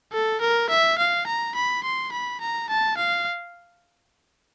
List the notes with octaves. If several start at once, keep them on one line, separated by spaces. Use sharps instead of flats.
A4
A#4
E5
F5
A#5
B5
C6
B5
A#5
A5
F5